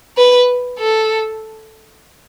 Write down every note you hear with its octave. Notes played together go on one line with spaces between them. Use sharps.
B4
A4